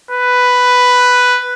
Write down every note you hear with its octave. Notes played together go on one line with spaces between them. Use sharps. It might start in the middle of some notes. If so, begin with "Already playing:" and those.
B4